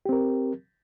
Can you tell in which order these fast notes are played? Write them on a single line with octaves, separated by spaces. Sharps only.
G4 C4 A#4